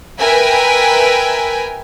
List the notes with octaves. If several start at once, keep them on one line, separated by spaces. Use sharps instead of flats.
A#4 B4 E5 G5 G#5